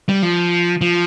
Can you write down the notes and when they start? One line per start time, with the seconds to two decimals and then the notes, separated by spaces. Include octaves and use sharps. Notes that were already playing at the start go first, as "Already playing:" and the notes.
0.09 G3
0.22 F3
0.81 F3